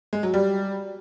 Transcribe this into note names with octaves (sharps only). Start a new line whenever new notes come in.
G#3
F#3
G3